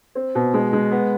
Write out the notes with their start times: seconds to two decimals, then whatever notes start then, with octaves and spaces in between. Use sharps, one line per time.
0.15 C4
0.35 B2
0.54 G#3
0.73 G#3
0.91 B3